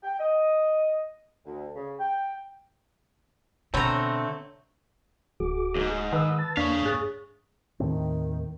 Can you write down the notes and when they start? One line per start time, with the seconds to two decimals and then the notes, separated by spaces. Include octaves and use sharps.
0.03 G5
0.19 D#5
1.46 D2
1.76 C#3
1.99 G5
3.74 B2 D3 A3 B3 C4 C#5 A#5
5.40 D1 F#4 G#4 D6
5.76 D#2 G#2
6.13 D#3 B4 D#6 E6
6.39 A5 A6
6.57 E2 A#3 D4 C#5 F5 B6
6.86 G#2 G#4 F#6 A6
7.80 D#2 A2 D#3 C4